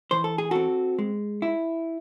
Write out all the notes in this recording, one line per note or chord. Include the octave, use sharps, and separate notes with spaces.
E3 C5
A4
G#4
C4 F#4 A4
G#3
E4